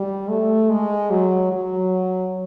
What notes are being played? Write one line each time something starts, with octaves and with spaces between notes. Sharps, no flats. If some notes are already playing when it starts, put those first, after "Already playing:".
Already playing: G3
A3
G#3
F#3
F#3